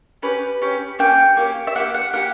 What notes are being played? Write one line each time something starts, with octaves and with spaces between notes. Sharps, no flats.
C#4 G4 B4
C#4 G4
A#3 C#4 G4 G5
A#3 C#4 G4
E5
A#3 E4 G4 F#5
F#5
A#3 E4 G4 F#5